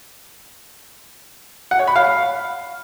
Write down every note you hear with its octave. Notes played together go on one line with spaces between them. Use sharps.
F#5
C#5
B5
F5